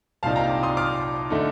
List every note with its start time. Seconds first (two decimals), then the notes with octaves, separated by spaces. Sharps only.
0.23 C2 A#2 G3 C4 D#4 F5 A5
0.36 G5 A#5
0.49 A#5 D6
0.63 C6 D#6
0.77 D6 F6
1.30 D3 A3 D#4